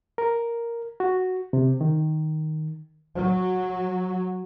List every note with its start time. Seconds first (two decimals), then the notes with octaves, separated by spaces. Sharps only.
0.18 A#4
1.00 F#4
1.53 C3
1.81 D#3
3.14 F#3